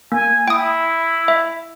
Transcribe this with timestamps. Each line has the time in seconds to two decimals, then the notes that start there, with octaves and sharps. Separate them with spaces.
0.12 A#3 G#5
0.48 E4 G5 D#6
1.28 E5